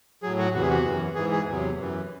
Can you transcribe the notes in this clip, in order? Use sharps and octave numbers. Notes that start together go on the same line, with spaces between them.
A2 F#3 G#4
F#4
E2 C3 E3 F#4
G#4
F#4
F#2 E3
G#2 E3 G#4
G#4
E2 C3 F#3
F#2 E3